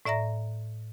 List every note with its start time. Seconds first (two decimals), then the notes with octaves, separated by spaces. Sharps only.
0.05 A2 D5 E5 A#5 A#6